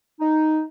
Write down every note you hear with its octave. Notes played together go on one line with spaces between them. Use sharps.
D#4